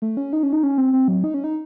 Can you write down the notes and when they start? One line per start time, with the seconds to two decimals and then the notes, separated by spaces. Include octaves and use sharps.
0.02 A3
0.17 C#4
0.33 D#4
0.43 C#4
0.53 D#4
0.63 C#4
0.78 C4
0.93 C4
1.08 F#3
1.24 D#4
1.34 C#4
1.44 D#4